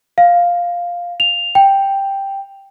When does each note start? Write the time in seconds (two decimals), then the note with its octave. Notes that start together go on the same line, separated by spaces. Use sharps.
0.18 F5
1.20 F7
1.55 G5